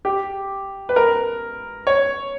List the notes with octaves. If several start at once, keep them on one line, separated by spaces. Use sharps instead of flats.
G4
B4
A#4
C#5